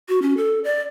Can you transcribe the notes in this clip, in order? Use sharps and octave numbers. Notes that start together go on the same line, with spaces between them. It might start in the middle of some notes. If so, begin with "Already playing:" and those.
F#4
C#4
A4
D5